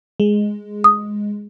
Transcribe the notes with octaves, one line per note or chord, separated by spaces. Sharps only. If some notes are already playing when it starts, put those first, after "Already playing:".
G#3
D#6